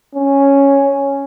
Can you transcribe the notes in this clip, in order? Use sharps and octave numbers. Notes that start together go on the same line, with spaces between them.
C#4